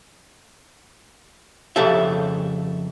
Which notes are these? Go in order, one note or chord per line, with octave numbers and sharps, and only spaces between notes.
F2 C#3 G4 A4 E5